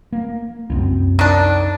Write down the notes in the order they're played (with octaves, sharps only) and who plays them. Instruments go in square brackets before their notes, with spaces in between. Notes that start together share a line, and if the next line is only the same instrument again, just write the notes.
[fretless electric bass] A#3
C2 F#2 C4
[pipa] D#3 D4